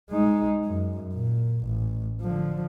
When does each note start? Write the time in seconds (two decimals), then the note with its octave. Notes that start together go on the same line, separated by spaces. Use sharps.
0.10 G#3 D#4
0.65 F#2
1.14 A#2
1.65 A1
2.21 D3 F3